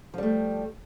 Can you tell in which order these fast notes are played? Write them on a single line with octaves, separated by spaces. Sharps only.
F3 G3 A3